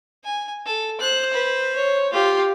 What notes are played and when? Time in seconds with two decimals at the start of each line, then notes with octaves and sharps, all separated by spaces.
0.24 G#5
0.66 A4
1.01 C5 F#6
1.33 B4
1.76 C#5
2.13 F4 G4